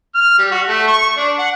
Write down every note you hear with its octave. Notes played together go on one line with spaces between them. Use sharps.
F6
G3
F#4
A3
C#6
D4
F#5